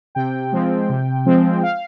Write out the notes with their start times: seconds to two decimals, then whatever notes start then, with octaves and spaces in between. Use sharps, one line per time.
0.15 C3 G5
0.52 F3 G#3 C4
0.90 C3
1.26 F3 G#3 C4
1.63 F5